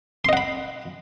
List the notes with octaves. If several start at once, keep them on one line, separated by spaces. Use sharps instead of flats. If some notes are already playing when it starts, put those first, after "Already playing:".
D#5 F#5 B5 C6